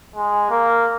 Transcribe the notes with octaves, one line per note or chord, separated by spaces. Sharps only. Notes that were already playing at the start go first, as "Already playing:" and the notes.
G#3
A#3